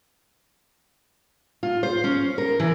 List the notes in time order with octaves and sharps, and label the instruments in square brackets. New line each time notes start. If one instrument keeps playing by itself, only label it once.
[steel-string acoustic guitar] F4
C5
C#4
A#4
E3